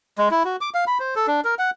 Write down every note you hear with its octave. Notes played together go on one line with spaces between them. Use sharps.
G#3
E4
F#4
D6
F5
B5
C5
A4
D4
A#4
F#5